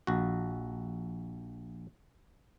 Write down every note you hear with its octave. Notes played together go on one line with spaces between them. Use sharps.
A#1 F#4